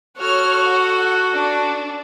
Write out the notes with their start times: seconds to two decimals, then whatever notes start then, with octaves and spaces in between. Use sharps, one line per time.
0.18 F#4 A4 C#5 F6
0.66 F#5
1.36 D4